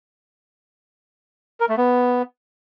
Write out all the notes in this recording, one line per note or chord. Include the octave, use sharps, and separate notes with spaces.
A#4
A3
B3